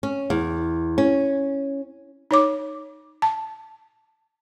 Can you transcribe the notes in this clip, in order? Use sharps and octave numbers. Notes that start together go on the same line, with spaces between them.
C#4
E2
C#4
D#4 C#5 D6
A5